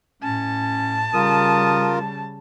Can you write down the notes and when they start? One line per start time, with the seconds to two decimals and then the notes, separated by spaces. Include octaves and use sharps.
0.23 A2 C#4 A5
1.14 C#3 G3 F4 A#4 D#6